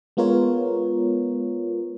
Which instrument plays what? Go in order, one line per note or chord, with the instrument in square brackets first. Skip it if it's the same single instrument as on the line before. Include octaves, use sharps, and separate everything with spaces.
[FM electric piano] G#3 B3 F4 A#4 C#5